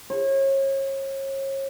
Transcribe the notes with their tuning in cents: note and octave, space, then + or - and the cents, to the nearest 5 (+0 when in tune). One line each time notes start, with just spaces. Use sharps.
C#5 -35